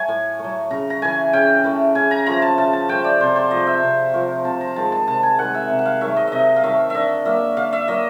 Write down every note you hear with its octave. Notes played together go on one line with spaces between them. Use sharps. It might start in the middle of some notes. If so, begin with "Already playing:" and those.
Already playing: F#3 A3 G#5
A2
F#3 A3
C#3 A#5
A#5
E3 A3 G#5
C#3 G5
E3 A3
C#3 G#5
A#5
F3 A3 A#5
A5
C#3 A5
A5
F3 A3 G5
D5
C3 C5
C5
F3 A3 D#5
E5
C3
F3 A3
C3 A5
A#5
D#3 G#3 A5
A5
C3 A5
G#5
D#3 G#3 F#5
E5
C3
F#5
F5
D#3 F#3 A3 E5
D#5
C3 D#5 E5
F5
D#3 F#3 A3 E5
D3 D#5 E5
F#3 A#3 E5
D3 F5
E5
F#3 A#3 D#5